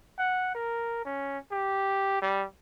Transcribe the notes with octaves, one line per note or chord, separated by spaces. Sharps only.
F#5
A#4
C#4
G4
G3